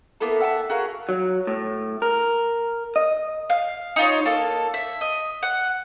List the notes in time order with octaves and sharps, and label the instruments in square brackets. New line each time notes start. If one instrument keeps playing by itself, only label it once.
[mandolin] A#3 B3 E4 A4
E5 F#5 G5 A5
F#4 G#4 A#4 F5
[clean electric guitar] F#3
A2
A#4
D#5
[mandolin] F5
D#4 F4 C#5
A#3 A4 A5
E5
D#5
F#5